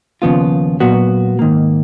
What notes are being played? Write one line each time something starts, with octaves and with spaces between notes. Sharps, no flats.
D#2 C#3 F3 B3 F4
A#2 F#3 B3 F#4
G#2 D#3 A#3